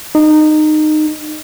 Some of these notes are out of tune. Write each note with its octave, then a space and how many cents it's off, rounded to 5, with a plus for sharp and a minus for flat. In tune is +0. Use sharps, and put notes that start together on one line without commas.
D#4 -20